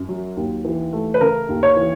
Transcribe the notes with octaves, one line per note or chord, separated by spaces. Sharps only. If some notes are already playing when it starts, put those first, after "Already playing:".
Already playing: F#2
F#3
D#2
E3
A3
B4
C#3 A#4
D#2
C#5
E3